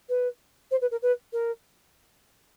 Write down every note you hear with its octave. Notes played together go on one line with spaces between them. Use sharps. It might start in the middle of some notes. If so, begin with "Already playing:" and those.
B4
C5
B4
A#4
B4
A#4